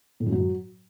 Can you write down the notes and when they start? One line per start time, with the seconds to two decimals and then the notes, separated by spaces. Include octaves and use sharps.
0.20 A2
0.26 F#2
0.32 F#3